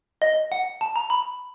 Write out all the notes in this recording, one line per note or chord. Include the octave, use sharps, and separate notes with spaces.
D#5
F#5
A5
A#5
B5